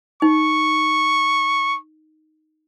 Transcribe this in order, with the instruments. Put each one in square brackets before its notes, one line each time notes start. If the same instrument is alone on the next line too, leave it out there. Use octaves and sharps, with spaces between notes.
[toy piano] D#4 [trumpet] C#6